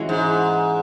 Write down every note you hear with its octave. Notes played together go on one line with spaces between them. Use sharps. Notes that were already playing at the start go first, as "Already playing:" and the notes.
Already playing: E3 G#3 C#4 F#4
G#2